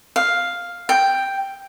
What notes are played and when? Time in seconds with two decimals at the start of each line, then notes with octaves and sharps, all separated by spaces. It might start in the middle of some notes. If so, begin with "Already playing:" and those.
0.16 F5
0.89 G5